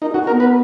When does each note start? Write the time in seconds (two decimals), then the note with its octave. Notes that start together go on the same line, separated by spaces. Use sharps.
0.02 D#4 A#4
0.11 C#4 F#4
0.21 D#4
0.27 A#4
0.30 B3
0.40 B4